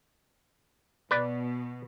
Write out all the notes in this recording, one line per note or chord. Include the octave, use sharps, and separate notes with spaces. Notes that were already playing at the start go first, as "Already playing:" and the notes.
B2 B4 D5